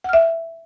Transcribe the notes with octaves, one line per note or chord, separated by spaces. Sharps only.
E5 F#5 F6